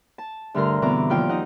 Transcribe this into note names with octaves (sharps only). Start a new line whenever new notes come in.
A5
D2 G2 D3 A#4 A#5 C6
B2 D3 E3 C4 A#5 D6
D#2 F3 F4 D5 G5
D#4 D#5 F#5